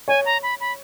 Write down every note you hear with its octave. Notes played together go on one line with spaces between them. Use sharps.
C#5 G#5
A#5
B5
B5